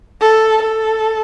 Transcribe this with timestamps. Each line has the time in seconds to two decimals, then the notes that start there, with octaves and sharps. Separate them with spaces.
0.21 A4
0.62 A4